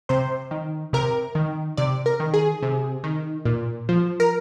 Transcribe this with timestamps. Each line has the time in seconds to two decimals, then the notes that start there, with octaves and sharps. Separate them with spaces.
0.09 C3 C5
0.51 D#3
0.93 C3 A#4
1.35 D#3
1.77 C3 D5
2.06 A#4
2.20 D#3
2.33 G#4
2.62 C3
3.04 D#3
3.45 A#2
3.89 F3
4.20 A#4